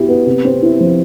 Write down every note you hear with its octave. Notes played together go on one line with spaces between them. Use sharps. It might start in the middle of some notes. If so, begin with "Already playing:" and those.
Already playing: B2 E4 G4
B3
C3
C4
E4
F3